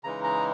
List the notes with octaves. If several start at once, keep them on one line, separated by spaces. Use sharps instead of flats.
C#3 E3 G#3 D#4 A#5
A#5